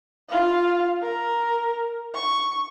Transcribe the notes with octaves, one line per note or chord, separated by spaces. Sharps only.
F4 F5
A#4
C#6